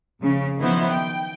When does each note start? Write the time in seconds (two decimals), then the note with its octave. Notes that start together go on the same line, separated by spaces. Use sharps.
0.21 F2 C#3
0.59 D#3 F3 F#3 B3 E4 C5
0.91 G5